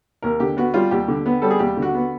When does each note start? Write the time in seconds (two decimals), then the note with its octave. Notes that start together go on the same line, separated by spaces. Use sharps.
0.22 D#2 A#4
0.40 D3 G4
0.57 B3 F#4
0.74 G3 F4
0.91 D#2 G4
1.08 D3
1.26 B3
1.42 G3 A4
1.50 G#4
1.59 D#2 G4
1.77 D3
1.82 F#4
1.94 B3